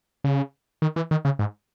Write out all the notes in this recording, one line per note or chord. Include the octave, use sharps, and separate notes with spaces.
C#3
D#3
E3
D#3
C#3
G#2